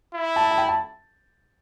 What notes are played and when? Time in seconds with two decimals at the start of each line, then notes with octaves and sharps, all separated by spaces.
0.14 E4
0.36 A5
0.51 A5
0.58 G5
0.69 A5